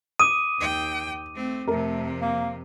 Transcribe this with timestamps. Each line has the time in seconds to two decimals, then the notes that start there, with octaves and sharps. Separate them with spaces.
0.19 D6 D#6 D#7
0.58 D#2 G5
1.35 A3 C4
1.67 F2 C3 A3 A#4
2.22 A#3